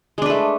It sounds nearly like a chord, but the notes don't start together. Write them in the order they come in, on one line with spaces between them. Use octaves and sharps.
G#3 D4 B4 A3